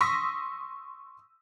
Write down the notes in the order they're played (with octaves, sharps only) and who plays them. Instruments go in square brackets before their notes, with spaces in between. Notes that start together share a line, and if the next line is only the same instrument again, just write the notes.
[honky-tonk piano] C6 C#6 D#6 E6 A#6 B6